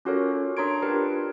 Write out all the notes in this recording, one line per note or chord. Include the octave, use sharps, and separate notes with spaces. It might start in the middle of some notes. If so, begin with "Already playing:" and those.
C#4 F4 F#4 A4 A#4 C#5
D4 C#5 A#5 C6 G#6 D7
D4 F4 G4 A#4 B4